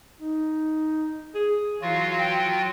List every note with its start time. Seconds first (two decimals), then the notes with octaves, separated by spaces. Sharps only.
0.21 D#4
1.35 G#4
1.82 E3 F#3 F4 F#4 F5
2.18 G5